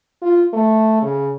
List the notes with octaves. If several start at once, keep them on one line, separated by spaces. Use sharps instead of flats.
F4
A3
C#3